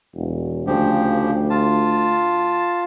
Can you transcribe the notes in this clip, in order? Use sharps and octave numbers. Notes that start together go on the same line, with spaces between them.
E1
D2 C#3 F3 G4
F4 A5